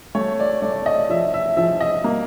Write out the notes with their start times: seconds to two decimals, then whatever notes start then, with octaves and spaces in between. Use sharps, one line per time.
0.15 A3 C#5
0.40 D5
0.62 A3 D5
0.86 D#5
1.10 F3 E5
1.34 E5
1.57 F3 E5
1.80 D#5
2.04 A#3